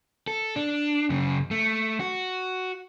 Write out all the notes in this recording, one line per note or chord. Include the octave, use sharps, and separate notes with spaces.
A4
D4
F#2 C#3
A3
F#4